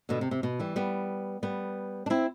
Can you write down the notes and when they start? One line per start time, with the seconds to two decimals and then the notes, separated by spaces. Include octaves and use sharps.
0.09 B2 D3
0.21 C3
0.31 C3
0.43 B2
0.60 E3 G3
0.76 G3 B3
1.43 G3 B3
2.06 D4
2.10 C4 E4